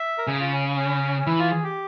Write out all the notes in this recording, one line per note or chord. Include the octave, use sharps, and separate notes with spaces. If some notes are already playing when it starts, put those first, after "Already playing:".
Already playing: E5
A#4
C#3 G#4
F4
C#4
C#4
C#4
E3 E4
F4
G#4
G4